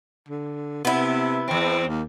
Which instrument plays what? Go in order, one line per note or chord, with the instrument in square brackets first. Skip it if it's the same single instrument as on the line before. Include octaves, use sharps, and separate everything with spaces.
[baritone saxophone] D3
[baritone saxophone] C3 [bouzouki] B3 E4
[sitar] E2 C4
[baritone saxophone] D#2